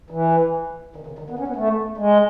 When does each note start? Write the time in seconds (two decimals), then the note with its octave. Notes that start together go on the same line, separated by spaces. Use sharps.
0.10 E3
0.96 D#3
1.07 C#3
1.19 D#3
1.30 B3
1.39 C#4
1.48 B3
1.56 A3
1.98 G#3